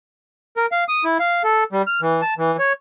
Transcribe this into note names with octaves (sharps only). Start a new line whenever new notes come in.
A#4
F5
D#6
E4
F5
A4
G3
F6
E3
A5
E3
C#5